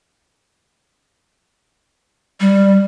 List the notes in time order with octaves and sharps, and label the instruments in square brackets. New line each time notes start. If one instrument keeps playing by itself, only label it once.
[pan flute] G3